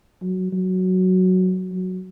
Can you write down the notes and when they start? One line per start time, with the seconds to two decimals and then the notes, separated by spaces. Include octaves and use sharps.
0.22 F#3
0.52 F#3
1.73 F#3